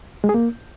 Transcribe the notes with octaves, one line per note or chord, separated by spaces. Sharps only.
G#3
G#4
A#3